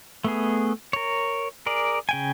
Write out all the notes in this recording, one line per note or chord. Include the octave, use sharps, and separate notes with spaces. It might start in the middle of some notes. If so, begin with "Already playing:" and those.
A3 B3 G#4
A#4 C#5
G#4 A#4 D5
C#3 G5 G#5